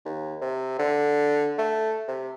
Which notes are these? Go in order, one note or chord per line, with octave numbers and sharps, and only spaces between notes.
D#2
C3
D3
A3
C3